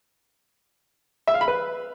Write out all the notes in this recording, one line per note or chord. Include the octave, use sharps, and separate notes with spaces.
E5
F5
B5
B4